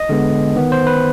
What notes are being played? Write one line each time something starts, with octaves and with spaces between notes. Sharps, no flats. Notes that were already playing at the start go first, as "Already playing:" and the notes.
Already playing: D#5
D3 G#3 B3
D#3 B3
C5
B4